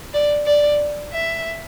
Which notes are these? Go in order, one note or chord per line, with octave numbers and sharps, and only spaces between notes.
D5
D5
E5